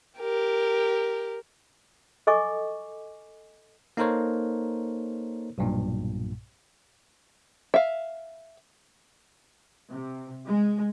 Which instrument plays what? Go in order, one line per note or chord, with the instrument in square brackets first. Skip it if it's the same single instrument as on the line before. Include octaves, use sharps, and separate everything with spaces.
[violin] G4 A#4
[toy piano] A4 D#5 G#5 C#6 D6
[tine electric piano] A#3 D#4 A4 A#4 C5 C#5
B1 G2 A#2
[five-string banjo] E5 F5
[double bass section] C3
G#3